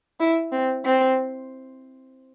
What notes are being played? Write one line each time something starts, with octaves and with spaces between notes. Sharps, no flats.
E4
C4
C4